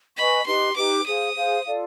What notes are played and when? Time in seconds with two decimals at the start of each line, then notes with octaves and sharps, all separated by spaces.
0.17 B4 D#5 G#5 B5 C#6
0.46 D#4 G4 B4 C6
0.76 D#4 G4 B4 D6
1.06 G#4 C5 F5 D#6
1.35 G#4 C5 F5
1.65 F4 A4 D5 F5